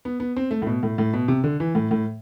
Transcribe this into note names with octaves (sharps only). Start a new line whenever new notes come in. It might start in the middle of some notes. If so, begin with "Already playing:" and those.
B3
B3
C4
A3
A2
B2
A2
A2
B2
C3
D3
E3
A2
A2